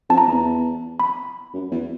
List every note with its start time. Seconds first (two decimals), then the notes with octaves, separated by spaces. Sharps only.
0.09 F2 A5
0.18 A#5
0.28 E2
1.00 B5
1.54 F#2
1.71 E2